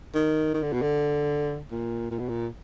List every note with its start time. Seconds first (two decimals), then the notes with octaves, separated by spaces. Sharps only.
0.15 D#3
0.54 D#3
0.63 D3
0.73 B2
0.82 D3
1.71 A#2
2.11 A#2
2.19 B2
2.29 A#2